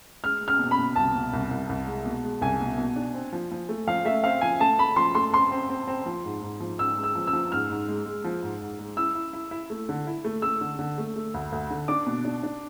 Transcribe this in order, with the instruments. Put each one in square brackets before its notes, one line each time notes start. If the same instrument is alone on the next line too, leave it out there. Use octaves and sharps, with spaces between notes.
[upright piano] G#3 [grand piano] F6
[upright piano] G#3
[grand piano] F6
[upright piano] B2
[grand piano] B5
[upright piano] B2
[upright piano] C2 [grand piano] A5
[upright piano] B2
C2
C2
C2
G#3
B2
G#3
[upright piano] C2 [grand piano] G#5
[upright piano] B2
B2
D4
C4
F3
F3
A3
[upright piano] F3 [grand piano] F5
[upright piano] A3 [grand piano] E5
[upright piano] C4 [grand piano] F5
[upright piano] F3 [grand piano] G#5
[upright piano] A3 [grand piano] A5
[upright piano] A3 [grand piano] B5
[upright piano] F3 [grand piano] C6
[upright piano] A3 [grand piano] C6
[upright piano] C4 [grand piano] C6
[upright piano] C4
C4
C4
F3
G#2
G#2
F3
[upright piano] G#2 [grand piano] E6
[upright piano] G#3
[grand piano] E6
[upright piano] F3
[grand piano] E6
[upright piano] F3
[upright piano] G#2 [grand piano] F6
[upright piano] G#2
G#3
G#3
F3
G#2
G#2
G#3
[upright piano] E4 [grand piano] E6
[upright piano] E4
E4
E4
A3
D3
E4
A3
[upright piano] A3 [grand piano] E6
[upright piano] D3
D3
A3
A3
D2
D2
D3
[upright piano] D4 [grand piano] D6
[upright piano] B2
D4
D4